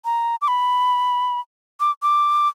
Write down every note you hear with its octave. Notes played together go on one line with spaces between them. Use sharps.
A#5
D6
B5
D6
D6